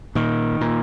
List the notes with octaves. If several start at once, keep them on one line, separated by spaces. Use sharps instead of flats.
A#2 D#3
A#2